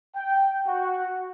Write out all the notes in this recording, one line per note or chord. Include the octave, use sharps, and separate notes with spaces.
G5
F#4